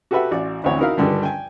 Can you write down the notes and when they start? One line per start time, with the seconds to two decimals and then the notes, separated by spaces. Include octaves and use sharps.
0.11 F#4 G4 A4 B4 E5 F#5
0.31 A1 F#4 D5
0.64 A1 D2 C4 E4 C#5 F#5
0.79 D#4 E4 F#4 A#4 E5 F5
0.97 C#2 G2 D3 D#3 G4
1.23 G5 G#5